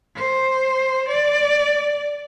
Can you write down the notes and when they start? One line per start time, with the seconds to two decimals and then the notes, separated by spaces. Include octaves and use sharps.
0.16 C5
1.08 D5